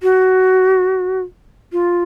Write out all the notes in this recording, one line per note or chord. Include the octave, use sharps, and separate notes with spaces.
F#4
F4